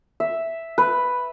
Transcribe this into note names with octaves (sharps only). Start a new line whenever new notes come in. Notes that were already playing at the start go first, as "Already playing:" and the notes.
E5
B4